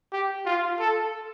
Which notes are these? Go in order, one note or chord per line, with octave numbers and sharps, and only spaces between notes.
G4
F4
A4